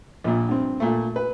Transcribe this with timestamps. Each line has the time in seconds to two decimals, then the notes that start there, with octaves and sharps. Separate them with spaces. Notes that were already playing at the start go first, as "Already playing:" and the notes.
0.24 A#1 A#2
0.49 G2 C4
0.80 A#2 A3
1.16 B4